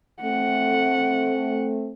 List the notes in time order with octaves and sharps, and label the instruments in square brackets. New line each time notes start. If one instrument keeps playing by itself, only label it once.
[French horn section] A3 C4 [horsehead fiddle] F#5